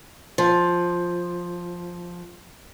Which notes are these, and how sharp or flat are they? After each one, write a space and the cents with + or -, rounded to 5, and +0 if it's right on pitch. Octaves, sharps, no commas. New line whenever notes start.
F3 +5